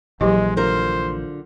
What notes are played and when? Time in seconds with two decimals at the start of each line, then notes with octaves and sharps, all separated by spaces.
0.21 A#1 E3 F#3 G#3 G4 D#5
0.57 D3 F4 A#4 C5